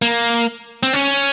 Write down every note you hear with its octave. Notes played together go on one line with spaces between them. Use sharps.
A#3
C4
C#4